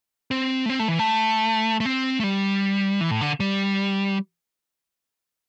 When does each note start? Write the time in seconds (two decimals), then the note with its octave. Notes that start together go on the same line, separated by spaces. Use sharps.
0.31 C4
0.66 A3
0.70 C4
0.79 A3
0.88 E3
0.99 A3
1.80 A3
1.85 C4
2.20 A3
2.24 G3
3.01 E3
3.11 A2
3.21 D3
3.40 G3